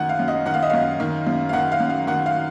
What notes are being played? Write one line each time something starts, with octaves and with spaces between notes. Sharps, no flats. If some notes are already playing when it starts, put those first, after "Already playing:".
Already playing: F#2 D#3 F#5
F5
F#2
D#5
D#3 F#5
F5
D#5
F#2 F5
D#3
F#2
F5
D#3 F#5
F5
F#2
F5
D#3 F#5
F5